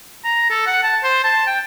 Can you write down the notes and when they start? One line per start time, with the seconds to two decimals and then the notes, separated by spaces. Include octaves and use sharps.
0.24 A#5
0.50 A4
0.66 F#5
0.83 A5
1.03 C5
1.24 A5
1.47 G5